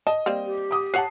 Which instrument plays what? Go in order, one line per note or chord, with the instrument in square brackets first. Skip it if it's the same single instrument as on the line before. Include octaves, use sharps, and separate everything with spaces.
[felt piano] D#5 [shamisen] A5
[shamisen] G3 A#3 C4
[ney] G4
[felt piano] D6 D#6
[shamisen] B4 C#5 F#5 [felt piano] A5 C7